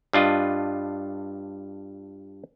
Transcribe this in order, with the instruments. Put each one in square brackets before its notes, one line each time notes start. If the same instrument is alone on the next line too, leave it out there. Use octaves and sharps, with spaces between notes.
[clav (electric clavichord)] G2 D4 F4 D#5